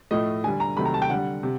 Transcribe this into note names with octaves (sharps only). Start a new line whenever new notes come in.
A2 F3 A3 D#5
D3 G3 G#5
A#5
C3 D#3 F#3 A3 B5
A#5
A5
G5
D3 G3 F#5
C3